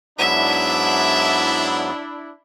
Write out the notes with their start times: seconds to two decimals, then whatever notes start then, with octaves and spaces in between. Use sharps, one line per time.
0.19 G#2 F#3 B3 D4 E4 E5